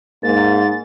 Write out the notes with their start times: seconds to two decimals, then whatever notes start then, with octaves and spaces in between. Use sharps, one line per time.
0.23 G#2 A#3 A6